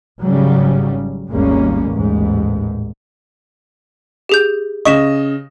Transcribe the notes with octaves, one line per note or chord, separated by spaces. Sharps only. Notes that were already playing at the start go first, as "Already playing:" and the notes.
G#1 G#2 C#3 F#3 G3 C#4
G#1 D#2 G3 G#3 A#3 C#4
A1 D#2 G#2
G4 G#4 G6
C#3 D#5 C#6 B6 E7